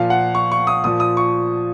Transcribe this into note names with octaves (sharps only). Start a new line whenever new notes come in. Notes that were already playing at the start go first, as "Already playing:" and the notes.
Already playing: A#2 F3 F5
F#5
C#6
C#6
D#6
A#2 F3 D#6
D#6
C#6